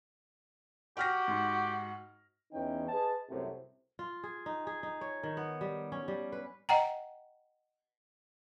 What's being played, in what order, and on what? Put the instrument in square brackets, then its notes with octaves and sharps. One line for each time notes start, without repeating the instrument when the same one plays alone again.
[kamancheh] F#4 [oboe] G4 [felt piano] G5 F6 A#6
[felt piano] G#2
[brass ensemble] E2 E3 C#4 D#4 G5
G#4 B4 D#5 A5
C2 F#2 A2 C3
[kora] F4
G#4
D#4
G#4
D#4
C#5
D#3
B3
G3
C#4
G3
B4
[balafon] D#5 F#5 G5 A#5